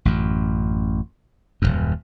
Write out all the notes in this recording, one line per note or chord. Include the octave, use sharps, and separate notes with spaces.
A1 F#2
D#1 G#1 F#2